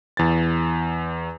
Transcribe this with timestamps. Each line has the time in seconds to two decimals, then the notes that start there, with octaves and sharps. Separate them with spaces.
0.17 E2 A6